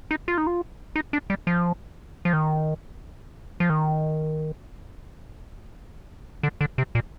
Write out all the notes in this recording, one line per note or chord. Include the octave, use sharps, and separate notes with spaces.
D#4
F4
D#4
F4
D#4
D4
G3
F3
F3
D#3
F3
D#3
D3
D3
C3
A#2